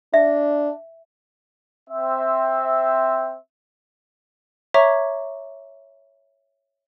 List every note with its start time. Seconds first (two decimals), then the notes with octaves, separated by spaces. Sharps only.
0.14 D4 E5
1.89 C4 E5
4.74 C#5 E5 A#5 C#6 D6 G#6